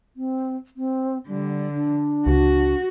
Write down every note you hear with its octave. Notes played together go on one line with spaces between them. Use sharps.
C4
C4
D3 G3
D4
C#2 F#4